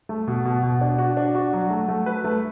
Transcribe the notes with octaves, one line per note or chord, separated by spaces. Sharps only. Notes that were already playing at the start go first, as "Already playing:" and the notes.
A3
B2
B2
B2
D4
F#4
D4
F#4
F#3
A3
A3
B4
A3